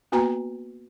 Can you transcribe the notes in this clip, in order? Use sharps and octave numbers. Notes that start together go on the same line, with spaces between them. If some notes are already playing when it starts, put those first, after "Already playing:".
A#3 B3 F#4 B4 G#5 A#5